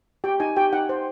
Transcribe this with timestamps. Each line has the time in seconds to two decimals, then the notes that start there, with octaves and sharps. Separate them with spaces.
0.24 G4 G5
0.40 D#4 G#5
0.56 G4 G5
0.73 D#4 F#5
0.89 C5